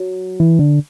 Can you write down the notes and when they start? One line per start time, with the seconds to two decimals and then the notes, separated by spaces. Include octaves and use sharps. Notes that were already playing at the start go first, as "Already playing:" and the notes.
Already playing: F#3
0.40 E3
0.59 D3